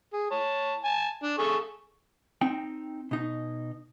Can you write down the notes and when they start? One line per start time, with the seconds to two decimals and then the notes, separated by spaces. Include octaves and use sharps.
0.13 G#4
0.31 C#5 A5
0.84 G#5 A5
1.23 D4
1.38 G#4 A4 C#6
2.41 C4 D#4 G5
3.11 B2 D#4